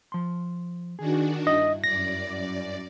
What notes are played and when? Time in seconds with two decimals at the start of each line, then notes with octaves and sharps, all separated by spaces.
0.12 F3 C6
0.99 D#3 D4 F#4 G#4
1.47 G2 E4 D#5
1.84 F#2 D5 A#6